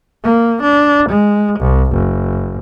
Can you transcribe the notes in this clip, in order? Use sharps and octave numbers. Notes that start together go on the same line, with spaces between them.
A#3
D4
G#3
C2
F#1